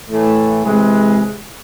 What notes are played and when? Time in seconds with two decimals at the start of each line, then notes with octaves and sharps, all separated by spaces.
0.08 A2 E3 A3
0.64 C3 E3 G#3